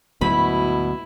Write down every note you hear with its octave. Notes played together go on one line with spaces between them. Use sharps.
D2 G#2 B2 F#3 E4 B5